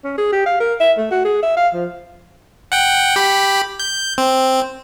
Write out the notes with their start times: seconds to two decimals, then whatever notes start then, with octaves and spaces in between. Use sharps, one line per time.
0.04 C#4
0.18 G#4
0.32 G4
0.46 F5
0.60 A#4
0.80 E5
0.98 A3
1.11 F#4
1.25 G#4
1.43 E5
1.57 F5
1.74 F3
2.72 F#5 G5
3.16 G4 B5
3.79 G6
4.18 C4